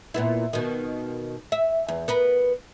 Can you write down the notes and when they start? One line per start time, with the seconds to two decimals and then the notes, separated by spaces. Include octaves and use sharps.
0.14 A#2 B3 E4
0.53 B2 D#3
1.52 E5
1.88 E2
2.08 B3 A#4 B4